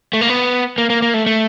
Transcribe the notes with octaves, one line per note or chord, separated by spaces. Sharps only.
A3
A#3
B3
A#3
A#3
A#3
A3
A3